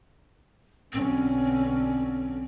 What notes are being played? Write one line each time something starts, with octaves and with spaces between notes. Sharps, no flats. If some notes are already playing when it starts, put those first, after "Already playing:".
B1 D3 C4 C#4